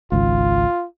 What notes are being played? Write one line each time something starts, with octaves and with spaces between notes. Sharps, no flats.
G#1 C#2 F4